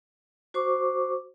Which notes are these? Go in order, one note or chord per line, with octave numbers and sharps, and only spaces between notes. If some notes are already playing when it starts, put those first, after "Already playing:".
F#4 C5 C#6 D6